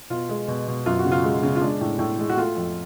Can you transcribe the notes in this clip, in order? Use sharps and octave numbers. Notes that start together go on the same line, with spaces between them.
B2 F4
G#3
B2
B2
F#2 F4
F#4
C#3
F4
G#3
C#3
F4
G#3 D4
A2
A2
G#3
F#4
A3 F4
F2